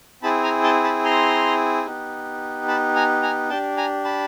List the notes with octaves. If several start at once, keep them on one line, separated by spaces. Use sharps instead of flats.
C4 E4 G#4 A5 B5
G#5 A#5
G5 A5
A5 B5
A#5 C6
B3 D#4 G4
A5 B5
G#5 A#5
G#5 A#5
D4 G4 G5 A5
G#5 A#5
A5 B5